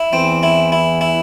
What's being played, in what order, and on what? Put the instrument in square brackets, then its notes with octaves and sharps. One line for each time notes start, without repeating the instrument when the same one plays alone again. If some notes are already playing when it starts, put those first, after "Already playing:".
Already playing: [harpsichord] E4
[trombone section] E2 E3 [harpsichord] C4
[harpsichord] E4
E4
E4